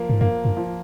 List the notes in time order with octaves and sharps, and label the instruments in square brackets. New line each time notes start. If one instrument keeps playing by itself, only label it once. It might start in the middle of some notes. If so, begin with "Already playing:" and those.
Already playing: [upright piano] F3 A#3
[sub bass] G#2
[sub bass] G2 [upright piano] A#3
[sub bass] G2
[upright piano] F3